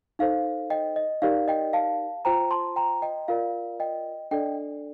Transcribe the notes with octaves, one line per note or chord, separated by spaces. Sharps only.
D#4 A4 C5 F5
D#5 G5
D#5
D#4 G4 A#4 D5 F5
D#5 G5
F5 A5
F4 C5 G5 A#5
A5 C6
G5 A#5
D#5 G5
F4 A#4 D5 F5
D#5 G5
D4 A4 D5 D#5 G5